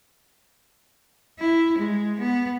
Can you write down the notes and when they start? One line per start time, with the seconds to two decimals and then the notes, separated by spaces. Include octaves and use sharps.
1.38 E4
1.76 G#3
2.18 B3